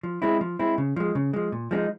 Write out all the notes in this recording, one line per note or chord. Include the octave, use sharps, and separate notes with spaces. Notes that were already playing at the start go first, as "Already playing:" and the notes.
F3
G#3 C4 E4
F3
G#3 C4 E4
C#3
F3 G#3
C#3
F3 G#3
A#2
F3 G#3 C4 D#4